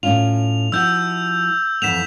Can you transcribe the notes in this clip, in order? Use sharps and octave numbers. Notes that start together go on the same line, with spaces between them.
A2 C#4 F4 F7
F3 E4 F#4 E6 G6
F2 E3 B3 B6 E7 F7